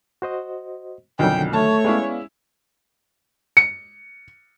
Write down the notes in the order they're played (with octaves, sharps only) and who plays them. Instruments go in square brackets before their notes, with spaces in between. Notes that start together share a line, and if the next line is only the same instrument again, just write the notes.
[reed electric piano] F#4 C5 D#5
[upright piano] B1 F2 [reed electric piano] D3 D#3 F#3 [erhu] G5
[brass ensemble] A3 [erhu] C#5 [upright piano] A5
[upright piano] G#3 C#4 E4 [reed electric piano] B3 D5 F5
[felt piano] C#7